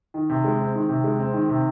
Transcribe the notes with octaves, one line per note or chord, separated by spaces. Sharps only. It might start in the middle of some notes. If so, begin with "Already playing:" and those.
D#3
C3
G#3
C4
D#3
C3
G#3
C4
D#3
C3